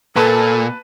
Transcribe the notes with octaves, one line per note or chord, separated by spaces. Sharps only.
A#2 A4 B4 A5 B5